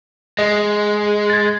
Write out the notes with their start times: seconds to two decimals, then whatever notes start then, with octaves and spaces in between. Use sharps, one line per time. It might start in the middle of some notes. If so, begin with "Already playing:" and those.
0.39 G#3 D#5
1.30 G#6 A6